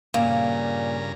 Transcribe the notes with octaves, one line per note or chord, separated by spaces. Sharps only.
G2 A#2 C#3 F5 A#5